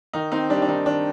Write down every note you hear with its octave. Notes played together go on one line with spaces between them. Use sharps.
D#3 D#4
C4 D#4
G3 D4
D4
D#3 D#4
D#3 D4